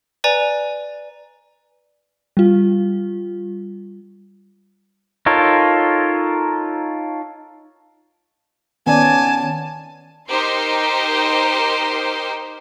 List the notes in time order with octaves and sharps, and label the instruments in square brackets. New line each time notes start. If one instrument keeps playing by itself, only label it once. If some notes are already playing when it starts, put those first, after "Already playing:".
[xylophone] B4 D5 G#5 A#5
[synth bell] G3 F4
[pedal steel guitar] D#4 F4 A4 A#4 C#5
[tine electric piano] D#3 [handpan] B3 C#4 D5 [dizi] G#5 [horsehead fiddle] A5
[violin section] D#4 G4 A#4 C5 C6